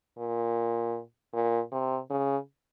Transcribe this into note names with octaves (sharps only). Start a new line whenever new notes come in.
A#2
A#2
C3
C#3